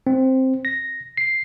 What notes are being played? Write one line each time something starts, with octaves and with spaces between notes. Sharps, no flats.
C4
A#6
C7